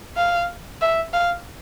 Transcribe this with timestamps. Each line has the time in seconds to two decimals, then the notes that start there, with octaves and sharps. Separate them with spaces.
0.17 F5
0.82 E5
1.14 F5